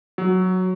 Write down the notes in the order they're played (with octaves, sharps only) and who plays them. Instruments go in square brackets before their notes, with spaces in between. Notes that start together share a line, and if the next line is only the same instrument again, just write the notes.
[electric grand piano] F#3